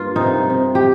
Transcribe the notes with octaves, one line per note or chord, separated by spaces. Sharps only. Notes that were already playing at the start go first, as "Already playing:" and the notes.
Already playing: G2 A#3 F4
C3 D#4
C3
G4